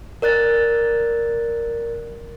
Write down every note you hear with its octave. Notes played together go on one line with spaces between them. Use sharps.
A#4 D5 F#6 A6